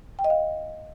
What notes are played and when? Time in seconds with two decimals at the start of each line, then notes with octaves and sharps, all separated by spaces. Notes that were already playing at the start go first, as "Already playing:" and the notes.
0.19 G5
0.24 D#5
0.30 F5